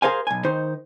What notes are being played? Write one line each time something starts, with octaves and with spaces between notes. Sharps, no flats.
G#4 A#4 C5 F5 G#5
B1 G#5
D#3 D#4 C5